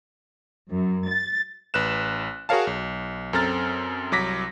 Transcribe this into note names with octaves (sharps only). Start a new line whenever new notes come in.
F#2
A6
A1 B4 F#6 E7
F#4 G#4 A#4 C#5 F5 A5
B1
F#2 C4 A4 A#5 F6 A6
C2 F#3 D6 A#6 B6